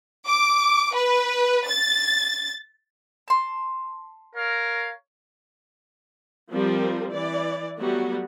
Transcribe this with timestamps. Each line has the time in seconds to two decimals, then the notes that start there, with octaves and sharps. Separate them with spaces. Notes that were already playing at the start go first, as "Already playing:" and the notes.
0.28 D6
0.94 B4
1.68 A6
3.28 A5 C6
4.36 A#4 C#5 F5
6.52 F3 G3 C4 A#4
7.10 E3 D5
7.79 F#3 G3 A3 B3 F#4